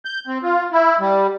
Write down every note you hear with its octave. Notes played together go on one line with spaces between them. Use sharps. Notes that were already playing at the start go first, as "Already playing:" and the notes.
G6
C4
F4
E4
G3